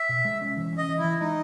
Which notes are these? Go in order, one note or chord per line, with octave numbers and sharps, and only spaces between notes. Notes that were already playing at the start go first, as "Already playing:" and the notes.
Already playing: E5
B2
G#3
C#4
E3
C#4 D#5
E3
E4
E3
G#3 D#4